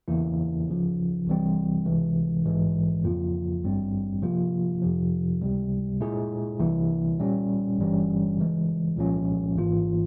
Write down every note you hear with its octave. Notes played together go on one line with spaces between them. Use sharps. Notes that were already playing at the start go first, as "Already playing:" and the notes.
E2 C#3 E3 A#3 E4
C#2 C#3 F3
C2 C3 E3 G3 C4
C#2 C3 E3 G#3
A#1 G#2 E3 G#3
F2 C#3 F3 A#3 F4
G#1 G2 G3 C4
C3 F3 A#3 F4
F2 C3 F3
C#2 C3 G3
A#2 G#3 E4 G#4
C2 C3 E3 A#3 E4
A#2 G3 C#4
G1 G2 E3 G3 C#4
C#3 E3 G#3
C2 A#2 F3 G#3 C#4
G#1 G#2 E3 A#3 F4